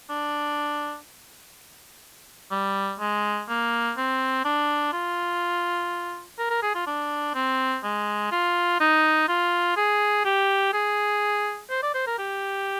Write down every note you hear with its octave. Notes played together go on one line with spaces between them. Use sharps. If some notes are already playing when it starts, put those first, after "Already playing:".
D4
G3
G#3
A#3
C4
D4
F4
A#4
A#4
G#4
F4
D4
C4
G#3
F4
D#4
F4
G#4
G4
G#4
C5
D5
C5
A#4
G4